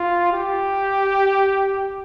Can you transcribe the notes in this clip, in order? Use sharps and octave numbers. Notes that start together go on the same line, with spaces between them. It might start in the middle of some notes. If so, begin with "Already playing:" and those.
Already playing: F4
G4